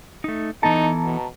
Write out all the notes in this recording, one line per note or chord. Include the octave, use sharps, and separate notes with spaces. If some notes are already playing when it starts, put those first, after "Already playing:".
A3 D#4
E3 B3 D#4 A4 A5 A#5
B2